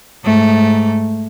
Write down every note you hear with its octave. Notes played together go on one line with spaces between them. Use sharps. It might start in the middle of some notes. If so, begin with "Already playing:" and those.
G#2 A3